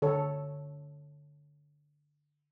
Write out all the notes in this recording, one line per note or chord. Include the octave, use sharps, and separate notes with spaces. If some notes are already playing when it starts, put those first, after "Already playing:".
D3 A4 C#5